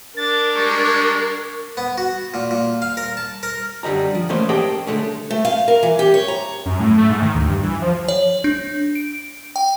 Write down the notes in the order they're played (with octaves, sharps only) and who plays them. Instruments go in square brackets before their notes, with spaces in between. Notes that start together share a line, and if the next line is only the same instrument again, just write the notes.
[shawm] D4 [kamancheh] A#4 [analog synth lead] A6
[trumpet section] G3 G#3 [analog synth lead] C#6
[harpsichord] B3
F#4
A#2
A#2
F5
A#4
A5
A#4
[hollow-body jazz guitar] F#2 D3 G3 D#5 A#5
F3
E3 A3 A#3 C#4 C5 D#5
G4 G#4 A#4 D#5 G5 A5
D3 G#3 A3 C#4
[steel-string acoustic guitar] A3
F5
A#4
E3
G4
C#5
A#5
[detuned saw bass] F#2
A2
A3
G#2
D#3
D2
G2
E3
F3
[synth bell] C#5
D4
D7
G5